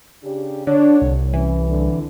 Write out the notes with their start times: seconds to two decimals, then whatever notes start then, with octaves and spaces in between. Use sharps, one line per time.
0.23 C#3 D4 G4
0.67 D3 D4 C#5
1.02 C2
1.33 E3 C#4
1.68 D3